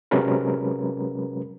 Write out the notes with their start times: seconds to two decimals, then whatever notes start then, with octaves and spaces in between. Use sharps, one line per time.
0.11 C3 F#3 G#3 C#4 A#4 B4